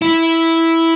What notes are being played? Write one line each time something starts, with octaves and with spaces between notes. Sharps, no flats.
E4